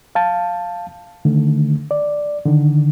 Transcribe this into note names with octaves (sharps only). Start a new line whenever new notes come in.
F5 A5
D3 D#3 A3
D5
D3 D#3